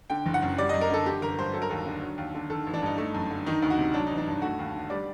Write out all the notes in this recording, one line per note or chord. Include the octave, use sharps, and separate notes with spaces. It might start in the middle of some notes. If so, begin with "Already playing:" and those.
D3 G5
F#1
F#5
F#2
G3 D5
F#2 D#5
A#4
D3 A4
D3 G4
G1 A#4
G2 C5
F#3 A4
A#4
D#2 A4
D3
F#3
D#2
D3
D#3 A4
A1
D4
G2 D#4
A3
F#2
D3
D#3 D#4
D2
F#4
C3
F#3 D4
A1 D#4
D4
G2 D#4
A3 F#4
D#2
D3
G3 D5